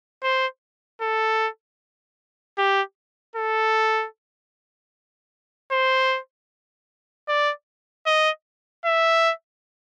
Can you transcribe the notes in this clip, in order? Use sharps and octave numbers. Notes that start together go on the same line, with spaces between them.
C5
A4
G4
A4
C5
D5
D#5
E5